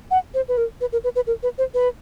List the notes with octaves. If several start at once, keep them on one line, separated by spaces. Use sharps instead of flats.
F#5
C5
B4
A#4
B4
A#4
B4
B4
A#4
B4
C5
B4